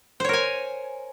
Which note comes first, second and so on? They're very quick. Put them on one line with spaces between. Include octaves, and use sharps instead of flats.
C5 C#5 A#4 G#5